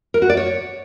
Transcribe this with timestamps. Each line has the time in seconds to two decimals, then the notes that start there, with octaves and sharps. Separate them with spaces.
0.14 A#4
0.22 F#4
0.29 D5
0.37 C#5